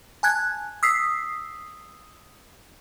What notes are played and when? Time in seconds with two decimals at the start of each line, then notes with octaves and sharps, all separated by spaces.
0.23 G#5 A5 F#6 G#6
0.83 D#6 E6 B6 C7